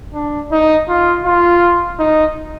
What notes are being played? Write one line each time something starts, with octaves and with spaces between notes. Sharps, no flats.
D4
D#4
F4
F4
D#4